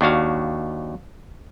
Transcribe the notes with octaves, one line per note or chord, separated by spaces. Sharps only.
D#2 D4 F#4 F5